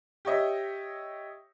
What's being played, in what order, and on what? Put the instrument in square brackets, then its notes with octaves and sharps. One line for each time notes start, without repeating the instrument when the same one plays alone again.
[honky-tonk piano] G4 C#5 D#5 E5